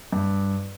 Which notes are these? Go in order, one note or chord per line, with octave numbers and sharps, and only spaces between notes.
G2